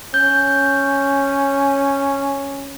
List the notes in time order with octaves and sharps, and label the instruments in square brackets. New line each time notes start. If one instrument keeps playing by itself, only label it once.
[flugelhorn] C#4 [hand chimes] G6